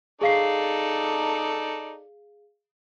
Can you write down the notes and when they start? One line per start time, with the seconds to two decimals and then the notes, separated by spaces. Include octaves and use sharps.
0.21 D#4 G#4 A4 D5 F5 C7